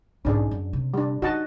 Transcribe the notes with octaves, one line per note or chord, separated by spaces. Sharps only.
B1 G#2 C#4 D4 G#4
F#2
C3
G3 D4
D#4 F#4 D#5 A5